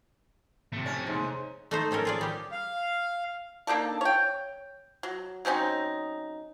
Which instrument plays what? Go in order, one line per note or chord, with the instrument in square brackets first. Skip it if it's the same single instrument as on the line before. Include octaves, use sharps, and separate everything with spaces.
[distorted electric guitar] C3 A3
[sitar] C#4
G#2
[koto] A3 D#4 C5
F3 C#4 A4 A#4
F4 G#4 D5
G3 G4
[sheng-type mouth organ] F5
[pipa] A#3 D4 D#4 A4
C#5 G5
F#3
F#3 C4 C#4 D#4